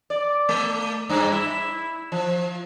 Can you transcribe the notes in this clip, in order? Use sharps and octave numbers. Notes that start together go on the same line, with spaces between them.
D5
A3
G2
E4
F3